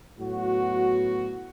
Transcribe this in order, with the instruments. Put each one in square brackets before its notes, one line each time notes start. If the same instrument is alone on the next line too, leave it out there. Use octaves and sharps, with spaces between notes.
[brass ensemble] A2 F#3 B3 F#4